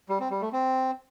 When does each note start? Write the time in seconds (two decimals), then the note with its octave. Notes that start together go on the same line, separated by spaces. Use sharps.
0.09 G3
0.20 C4
0.31 G3
0.42 A3
0.53 C4